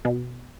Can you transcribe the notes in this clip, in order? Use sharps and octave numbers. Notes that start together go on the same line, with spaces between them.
B2